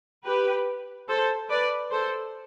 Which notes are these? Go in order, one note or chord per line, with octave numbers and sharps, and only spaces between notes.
G4 B4
A4 C5
B4 D5
A4 C5